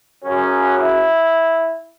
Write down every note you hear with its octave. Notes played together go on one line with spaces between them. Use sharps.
F#2 C#3 F#3 C#4
E4